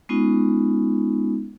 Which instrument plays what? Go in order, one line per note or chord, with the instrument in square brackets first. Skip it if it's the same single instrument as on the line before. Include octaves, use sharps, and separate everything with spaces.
[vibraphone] G#3 B3 C#4 D#4 F4